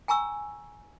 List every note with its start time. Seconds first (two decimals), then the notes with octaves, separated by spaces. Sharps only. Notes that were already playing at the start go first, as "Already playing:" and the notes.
0.08 G5 G#5 A#5 C#6 E6